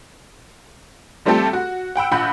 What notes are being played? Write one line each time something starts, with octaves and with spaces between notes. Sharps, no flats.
F3 G3 A3 C4 G4 A4
F#4
F#5 G5 B5 E6
A#1 F4 F#5 B5 G6